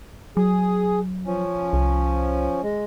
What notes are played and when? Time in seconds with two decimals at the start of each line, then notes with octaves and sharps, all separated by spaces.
0.37 F#3 G#4
1.26 F3 C#4
1.73 C2
2.63 G#3